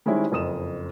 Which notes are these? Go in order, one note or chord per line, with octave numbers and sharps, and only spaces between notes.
D#3 G3 G#3 C4 C#4 E4
F#1 F2 D#6 E7